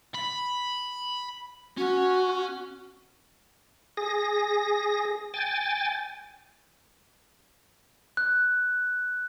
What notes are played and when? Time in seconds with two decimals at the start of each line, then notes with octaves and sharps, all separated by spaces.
0.14 B5
1.77 C#4 F#4
3.97 G#4 A#6
5.34 G5 G#5 A6
8.17 F#6